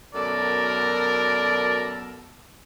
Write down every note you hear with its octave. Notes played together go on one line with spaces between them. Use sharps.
F#2 B2 A4 A#4 D5